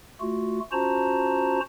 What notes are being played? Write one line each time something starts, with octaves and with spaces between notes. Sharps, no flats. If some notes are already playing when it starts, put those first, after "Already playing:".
A3 F4 F#4
C#4 F4 F#4 C5 A5 A#5